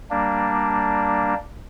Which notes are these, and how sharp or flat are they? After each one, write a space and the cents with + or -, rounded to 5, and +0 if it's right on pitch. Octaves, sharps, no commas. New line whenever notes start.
G3 +0 A#3 +0 D4 +0